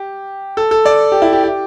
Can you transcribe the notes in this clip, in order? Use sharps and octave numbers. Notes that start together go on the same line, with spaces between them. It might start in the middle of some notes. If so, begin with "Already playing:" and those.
Already playing: G4
A4
A4
D5
G4
E4
G4
G4